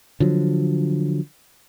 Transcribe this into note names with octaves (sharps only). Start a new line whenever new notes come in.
D3 F3 F#3